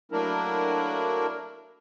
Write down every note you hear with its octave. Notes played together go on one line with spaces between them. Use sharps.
F#3 A3 A#3 D4 E4 A#4